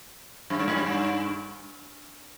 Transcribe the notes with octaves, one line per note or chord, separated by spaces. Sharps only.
F#2
G2
G#2
F#2
G2